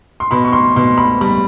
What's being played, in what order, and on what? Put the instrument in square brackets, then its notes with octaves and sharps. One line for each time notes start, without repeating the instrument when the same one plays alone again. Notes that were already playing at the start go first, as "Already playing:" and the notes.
[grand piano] C6
B2 B5
C#6
C6
B2 C6
B5
G3 B5